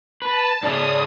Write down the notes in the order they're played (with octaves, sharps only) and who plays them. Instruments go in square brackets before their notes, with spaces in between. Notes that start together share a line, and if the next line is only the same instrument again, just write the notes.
[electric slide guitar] B4 [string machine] A5
[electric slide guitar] G#2 C#3 C#4 [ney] D5 [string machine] D#6